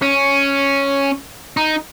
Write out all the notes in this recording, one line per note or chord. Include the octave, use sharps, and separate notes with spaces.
C#4
D#4